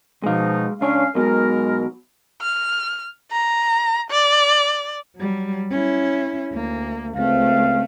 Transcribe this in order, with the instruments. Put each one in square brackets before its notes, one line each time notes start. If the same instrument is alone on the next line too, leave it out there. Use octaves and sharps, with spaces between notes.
[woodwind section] B2 F3 D#4 [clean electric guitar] G#3 F5
[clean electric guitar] C#2 D4 C#5 [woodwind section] C#4 F5
[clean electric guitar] B1 B2 [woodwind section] G#3 A#4
[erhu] F6
A#5
D5
[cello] F#3 G3
C#4 E4
D2 A#3
[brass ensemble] C#2 C4 F5 [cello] A3